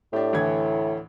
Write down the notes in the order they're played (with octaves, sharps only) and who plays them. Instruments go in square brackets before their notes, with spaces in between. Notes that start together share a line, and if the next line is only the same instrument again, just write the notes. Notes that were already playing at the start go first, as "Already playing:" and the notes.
[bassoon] A2 [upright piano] D4 G4
[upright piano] D2 E3 G#6